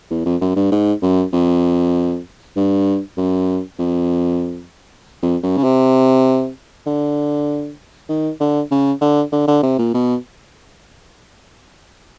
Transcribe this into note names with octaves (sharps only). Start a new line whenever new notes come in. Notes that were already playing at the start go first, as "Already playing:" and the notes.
E2
F2
F#2
G2
G#2
F#2
F2
G2
F#2
F2
F2
F#2
C#3
C3
D3
D#3
D3
C#3
D3
D3
D3
C3
A#2
B2